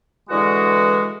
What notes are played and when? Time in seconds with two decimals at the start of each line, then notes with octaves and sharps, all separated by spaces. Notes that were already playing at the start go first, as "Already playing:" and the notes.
0.30 D3 E3 G#3 F#4